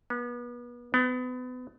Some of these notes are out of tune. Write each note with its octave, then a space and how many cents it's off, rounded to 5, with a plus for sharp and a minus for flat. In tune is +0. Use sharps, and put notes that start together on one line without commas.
B3 -35
B3 +30